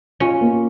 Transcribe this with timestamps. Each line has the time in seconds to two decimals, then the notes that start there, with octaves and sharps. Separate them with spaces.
0.20 C#4 F4
0.41 A#3